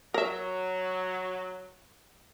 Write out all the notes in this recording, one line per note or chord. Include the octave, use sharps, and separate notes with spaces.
F#3 A#4 E5